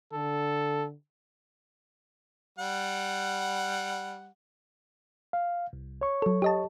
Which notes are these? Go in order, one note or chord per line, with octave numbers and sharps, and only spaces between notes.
D3 A4
G3 F#5
F5
C2
C#5 C#6
F#3 A4
G4 D#5 A5